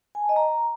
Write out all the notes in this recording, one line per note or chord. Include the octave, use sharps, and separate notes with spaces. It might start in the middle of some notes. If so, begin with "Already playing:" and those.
G#5
A5
D#5
A#5